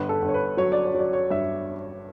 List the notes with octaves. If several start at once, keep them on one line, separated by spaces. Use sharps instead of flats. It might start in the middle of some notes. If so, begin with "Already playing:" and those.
Already playing: G1 B4
A4
G1
C#5
B4
F#3 C#5
D5
C#5
F#3 D5
C#5
G2 E5